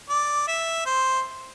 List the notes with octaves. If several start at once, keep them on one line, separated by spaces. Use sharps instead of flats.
D5
E5
C5